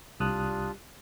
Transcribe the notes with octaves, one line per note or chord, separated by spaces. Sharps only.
C2 G3 D4 F4 D#6 F#6